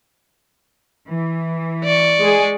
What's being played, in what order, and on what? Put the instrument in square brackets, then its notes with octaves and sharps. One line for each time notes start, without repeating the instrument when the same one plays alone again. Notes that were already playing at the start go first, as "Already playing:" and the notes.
[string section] E3
[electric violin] D5 C#6
[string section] G#3 G#4